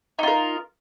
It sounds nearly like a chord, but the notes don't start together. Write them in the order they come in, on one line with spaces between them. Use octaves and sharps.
D#4 F4 A#4